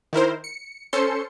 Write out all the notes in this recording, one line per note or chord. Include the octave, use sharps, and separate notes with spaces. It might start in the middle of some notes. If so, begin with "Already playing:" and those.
D#3 E4 A#4 C5
C#7
C#4 A4 C5 C6 C#7